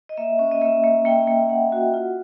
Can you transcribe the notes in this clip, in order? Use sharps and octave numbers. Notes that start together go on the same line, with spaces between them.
D#5
A#3 E5
C#4
D#5
A#3 E5
A#3
A#3 G5
A#3
A#3 F#5
F#4
F4